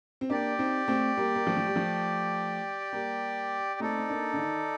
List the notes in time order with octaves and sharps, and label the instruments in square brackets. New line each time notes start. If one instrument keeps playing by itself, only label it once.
[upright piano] C4
[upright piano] A#3 D4 [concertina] G4 D5 G5
[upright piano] C4 D#4
A3 C4
G3 A#3
A#3
F3 A3
F3
G3
F3 A3
G3 A#3
[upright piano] A3 C4 [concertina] D#4 A4 D5
[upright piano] C4
A#3 D4
D3
D#3